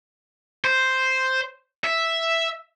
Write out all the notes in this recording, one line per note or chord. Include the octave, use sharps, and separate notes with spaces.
C5
E5